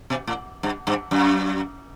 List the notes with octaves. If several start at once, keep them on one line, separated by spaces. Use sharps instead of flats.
B2
A2
G2
G2
F#2